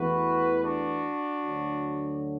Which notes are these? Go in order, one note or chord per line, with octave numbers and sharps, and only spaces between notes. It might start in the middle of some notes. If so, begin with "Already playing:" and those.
Already playing: E2 E3 A3 F#4 B4
D4 F#4
D2 D3 F#3